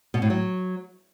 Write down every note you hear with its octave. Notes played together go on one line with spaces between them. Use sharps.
B2
A2
F#3